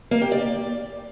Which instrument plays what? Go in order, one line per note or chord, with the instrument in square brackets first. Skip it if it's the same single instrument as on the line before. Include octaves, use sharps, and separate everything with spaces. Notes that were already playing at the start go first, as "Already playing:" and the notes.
[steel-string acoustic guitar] A#3
G4
D5